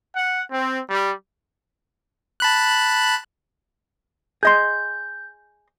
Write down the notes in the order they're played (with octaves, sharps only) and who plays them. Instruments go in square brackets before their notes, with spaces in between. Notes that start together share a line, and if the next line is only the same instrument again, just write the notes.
[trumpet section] F#5
C4
G3
[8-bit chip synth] A5 B5 F#6
[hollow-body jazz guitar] G#4 D#5 C6 [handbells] G6